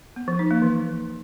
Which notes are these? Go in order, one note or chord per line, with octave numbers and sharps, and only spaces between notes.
B3
F3
D#4
A#3
E3